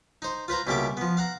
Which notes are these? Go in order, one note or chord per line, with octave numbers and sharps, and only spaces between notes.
D#4 C5
F4 B4 C5 A#5
C#2 B2 G3 A#3 E5 D6
F3 B3
F5 F#5 A#5